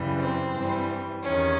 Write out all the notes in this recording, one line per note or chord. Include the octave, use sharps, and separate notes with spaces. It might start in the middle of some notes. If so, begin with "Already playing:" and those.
Already playing: F#2 C#3 E3 G3
C4
G2 E3 G3
E2 C3 D#3 C#4